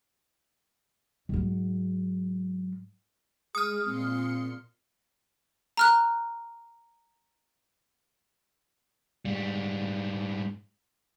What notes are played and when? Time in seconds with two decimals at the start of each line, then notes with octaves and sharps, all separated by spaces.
1.29 G#2 F#3
3.55 G#3 G#4 D#6 F6
3.85 A#2 C4 C6 C#7
5.77 A#5 F6 F#6
9.25 G#2 G3